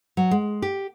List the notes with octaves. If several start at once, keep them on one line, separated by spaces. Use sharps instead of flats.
F#3
G#3
G4